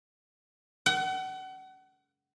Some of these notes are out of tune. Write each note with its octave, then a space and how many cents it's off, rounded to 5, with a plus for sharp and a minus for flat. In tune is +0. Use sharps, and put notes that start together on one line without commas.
F#5 +35